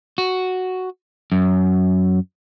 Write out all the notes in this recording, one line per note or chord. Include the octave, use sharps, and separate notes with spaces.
F#4
F#2